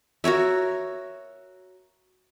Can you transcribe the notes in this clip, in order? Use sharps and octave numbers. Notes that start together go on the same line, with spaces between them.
F#4 A#4 C#5 E5